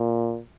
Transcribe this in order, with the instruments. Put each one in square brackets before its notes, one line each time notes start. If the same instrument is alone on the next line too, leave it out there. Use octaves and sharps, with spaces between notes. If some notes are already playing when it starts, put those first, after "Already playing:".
Already playing: [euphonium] A#2